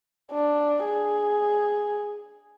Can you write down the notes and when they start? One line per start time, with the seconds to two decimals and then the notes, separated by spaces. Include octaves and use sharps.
0.32 D4
0.85 G#4